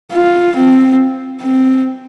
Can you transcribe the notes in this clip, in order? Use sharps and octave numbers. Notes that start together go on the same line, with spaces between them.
F4
C4
C4